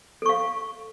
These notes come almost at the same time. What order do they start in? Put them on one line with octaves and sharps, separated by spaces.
A4 C#6 F5